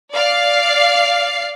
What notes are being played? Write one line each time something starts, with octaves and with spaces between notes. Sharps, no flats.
D5 F5 C7